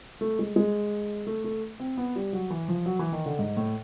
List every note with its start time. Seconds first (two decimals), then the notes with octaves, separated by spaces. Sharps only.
0.21 A3
0.39 G#3
0.56 G#3
1.27 A3
1.44 A3
1.80 C4
1.97 B3
2.16 G3
2.33 F#3
2.50 E3
2.68 F3
2.86 F#3
2.99 E3
3.12 D#3
3.26 D3
3.39 G#2
3.57 A2